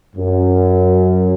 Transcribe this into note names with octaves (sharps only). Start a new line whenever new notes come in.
F#2